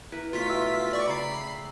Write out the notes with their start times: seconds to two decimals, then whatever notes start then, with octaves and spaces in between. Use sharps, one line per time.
0.12 E4 A#4 B4
0.33 B2 A3 F4 C#5 B6
0.49 E5 G5
0.93 D5 C#6
1.07 C#3 D5 A#5 B5 D6 C7